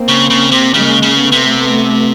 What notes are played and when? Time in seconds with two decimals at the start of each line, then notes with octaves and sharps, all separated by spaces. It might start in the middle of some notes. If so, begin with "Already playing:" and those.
Already playing: A#3 C4
0.08 C#3
0.30 C#3
0.51 C3
0.73 C#3 G#3 A#3
1.02 C#3
1.18 A3 B3
1.32 C3